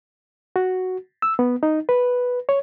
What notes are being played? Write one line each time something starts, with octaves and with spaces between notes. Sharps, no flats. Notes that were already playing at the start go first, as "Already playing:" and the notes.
F#4
E6
B3
D#4
B4
C#5